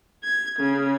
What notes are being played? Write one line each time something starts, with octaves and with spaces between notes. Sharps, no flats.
G#6
C#3